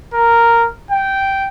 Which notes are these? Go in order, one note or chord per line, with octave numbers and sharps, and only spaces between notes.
A#4
G5